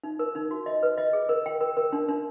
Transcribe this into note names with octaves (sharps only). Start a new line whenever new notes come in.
D#4
A#4
D#4
F#4
D#5
B4
D#5
G#4
A#4
G5
A#4
A#4
D4
D4